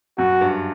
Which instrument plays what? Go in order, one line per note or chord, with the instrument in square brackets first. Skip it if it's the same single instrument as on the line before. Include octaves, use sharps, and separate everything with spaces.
[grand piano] F#2 [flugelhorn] F#4
[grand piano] G2